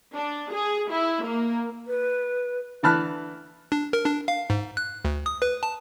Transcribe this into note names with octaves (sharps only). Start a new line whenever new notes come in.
D4
G#4
E4
A#3
B4
D3 E3 A5 B5 F6 F#6
D4
A#4
D4
F5
G#2
F#6
D2
D#6
B4
A5